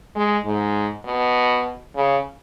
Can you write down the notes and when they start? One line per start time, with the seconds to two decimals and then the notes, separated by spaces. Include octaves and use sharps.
0.16 G#3
0.45 G#2
1.05 B2
1.96 C#3